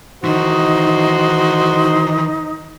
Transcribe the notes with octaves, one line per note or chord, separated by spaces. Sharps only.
D#3 E3 D#4 F#4 C5